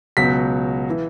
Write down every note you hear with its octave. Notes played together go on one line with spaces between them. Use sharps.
C#2 B2 F#3 B6
E3